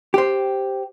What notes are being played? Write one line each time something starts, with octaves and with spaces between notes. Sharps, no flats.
G4 C5